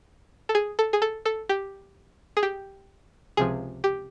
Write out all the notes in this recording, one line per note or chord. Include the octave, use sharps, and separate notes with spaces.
A4
G#4
A4
G#4
A4
A4
G4
G#4
G4
C#2 C3 F3 G#4
G4